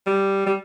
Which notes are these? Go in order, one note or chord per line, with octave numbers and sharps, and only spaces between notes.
G3
G3